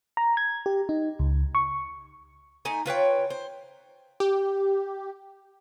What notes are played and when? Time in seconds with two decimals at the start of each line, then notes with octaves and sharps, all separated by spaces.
0.17 A#5
0.37 G#6
0.66 G4
0.89 D#4
1.19 C#2
1.55 C#6
2.65 A3 D#4 G#5
2.86 F4 B4 C#5 G5
3.30 C5
4.20 G4